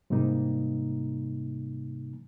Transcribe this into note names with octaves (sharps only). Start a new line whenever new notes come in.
G#2 C3 G3 A#3 D#4